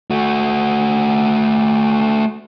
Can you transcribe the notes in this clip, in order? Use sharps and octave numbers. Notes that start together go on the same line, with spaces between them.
A3 F#4